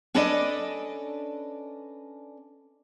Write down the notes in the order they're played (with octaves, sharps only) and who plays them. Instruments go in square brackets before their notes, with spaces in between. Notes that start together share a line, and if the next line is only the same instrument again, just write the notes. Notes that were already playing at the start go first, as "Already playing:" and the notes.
[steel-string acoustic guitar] C#4 D4 A4 B4 D5 D#5